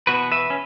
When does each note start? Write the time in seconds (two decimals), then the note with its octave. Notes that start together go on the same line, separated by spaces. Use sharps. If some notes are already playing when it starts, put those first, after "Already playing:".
0.07 E2 B2 B3 F#4 B4
0.32 B4 E5
0.50 C#4